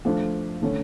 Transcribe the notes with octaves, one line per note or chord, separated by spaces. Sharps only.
F3 A3 D4 F4
D3 A3 C#4